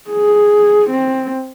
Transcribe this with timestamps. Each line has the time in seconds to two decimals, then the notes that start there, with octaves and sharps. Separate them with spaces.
0.10 G#4
0.90 C4